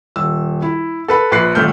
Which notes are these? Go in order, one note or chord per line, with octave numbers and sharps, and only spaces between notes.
D#1 E6
E4
A4 B4 B5
A#1 B4 F#6 C7
D#1 G#1 A3 F6 G6